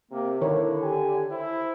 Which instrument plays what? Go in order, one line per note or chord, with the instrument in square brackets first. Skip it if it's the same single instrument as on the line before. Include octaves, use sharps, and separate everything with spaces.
[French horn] C3 [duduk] A#3
[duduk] D3 [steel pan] D#3 A#4 C#5 [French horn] E4
[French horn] G4 [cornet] G#5
[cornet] E4 [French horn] C5